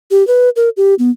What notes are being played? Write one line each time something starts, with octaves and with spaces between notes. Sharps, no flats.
G4
B4
A#4
G4
B3